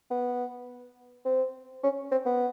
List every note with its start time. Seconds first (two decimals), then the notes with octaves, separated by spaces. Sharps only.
0.11 B3
1.25 C4
1.83 C#4
2.12 C4
2.26 B3